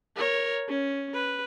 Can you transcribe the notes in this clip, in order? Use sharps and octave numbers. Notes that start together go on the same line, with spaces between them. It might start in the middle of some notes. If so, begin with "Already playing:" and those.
A#4 C#5
C#4
B4